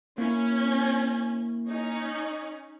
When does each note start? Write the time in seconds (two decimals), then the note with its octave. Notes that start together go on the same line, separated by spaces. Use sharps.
0.18 A#3 C#4 E4
1.68 C#4 D#4